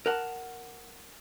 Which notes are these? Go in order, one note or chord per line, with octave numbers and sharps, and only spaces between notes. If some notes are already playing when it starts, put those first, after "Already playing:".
A#4 F#5 A5